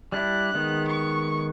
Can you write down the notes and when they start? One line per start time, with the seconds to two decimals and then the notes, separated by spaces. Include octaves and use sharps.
0.12 G3 D4 E4 F#6
0.55 D#3 G#3 B3
0.87 C#6